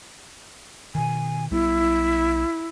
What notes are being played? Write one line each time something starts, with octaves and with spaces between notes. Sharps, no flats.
B2 D#3 G#5
B1 G3 B3 E4